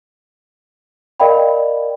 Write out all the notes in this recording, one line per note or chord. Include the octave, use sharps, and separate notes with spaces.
A#4 D5 D#5 F5 G5 B5